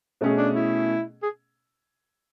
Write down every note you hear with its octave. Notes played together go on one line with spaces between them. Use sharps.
B2 A3 C#4 G#4
D4
E4
G#4